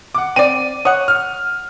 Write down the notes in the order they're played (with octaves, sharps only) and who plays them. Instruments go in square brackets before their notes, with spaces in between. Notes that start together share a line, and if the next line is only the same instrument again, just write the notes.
[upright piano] F#5 D6
[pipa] C4 D5 [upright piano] D#7
[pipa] C#5 F#5 [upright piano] D#6
[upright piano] F6